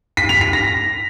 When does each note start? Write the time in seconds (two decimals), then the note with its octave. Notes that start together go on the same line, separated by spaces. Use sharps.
0.17 B6
0.29 F7
0.41 B6
0.53 A#6